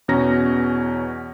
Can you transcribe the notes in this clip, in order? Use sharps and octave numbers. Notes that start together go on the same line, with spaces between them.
E2 B2 C#4 A#5 A#6